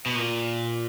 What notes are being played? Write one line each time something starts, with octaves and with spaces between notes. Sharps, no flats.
B2
A#2